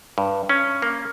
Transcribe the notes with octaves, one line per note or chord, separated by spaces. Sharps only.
G2
C#4
A#3